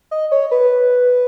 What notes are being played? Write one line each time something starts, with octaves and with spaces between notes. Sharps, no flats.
D#5
C#5
B4